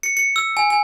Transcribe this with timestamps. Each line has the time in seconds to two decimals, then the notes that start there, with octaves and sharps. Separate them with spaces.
0.03 C#7
0.17 C#7
0.36 E6
0.57 G#5
0.70 G#5